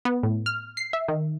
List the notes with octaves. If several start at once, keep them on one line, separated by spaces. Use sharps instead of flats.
B3
A2
F6
C7
E5
D#3